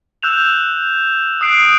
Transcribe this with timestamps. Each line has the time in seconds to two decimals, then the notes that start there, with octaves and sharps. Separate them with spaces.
0.22 E6 F#6 G6 E7 F7
1.41 D#6 F#6 C7 D7